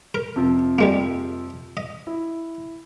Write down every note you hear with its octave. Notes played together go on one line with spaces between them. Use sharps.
A#4
F2 C3 F3
G3 G#3 A#3
D#5
E4